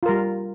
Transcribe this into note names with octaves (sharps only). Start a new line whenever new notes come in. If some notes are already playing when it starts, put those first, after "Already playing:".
G3 F4 A#4